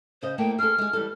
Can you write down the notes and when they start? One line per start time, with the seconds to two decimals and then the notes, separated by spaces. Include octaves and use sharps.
0.22 C#3 C5 D#5
0.38 A3 A#3 E4 G5
0.59 G#4 A4 F6
0.78 G#3 G#4
0.93 E3 G3 A4